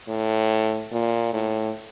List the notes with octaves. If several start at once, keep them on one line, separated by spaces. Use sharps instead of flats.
A2
A#2
A2